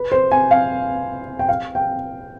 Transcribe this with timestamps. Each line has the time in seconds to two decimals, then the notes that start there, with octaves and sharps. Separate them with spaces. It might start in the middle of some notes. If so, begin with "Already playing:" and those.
Already playing: B4
0.12 C5
0.32 G#5
0.51 F5
1.39 G5
1.49 F5
1.75 G5